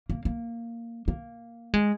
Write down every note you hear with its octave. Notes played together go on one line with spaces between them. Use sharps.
A#3
A#3
A#3
G#3